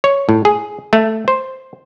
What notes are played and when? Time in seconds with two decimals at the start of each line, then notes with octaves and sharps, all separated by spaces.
0.04 C#5
0.29 A2
0.45 G#4
0.93 A3
1.28 C5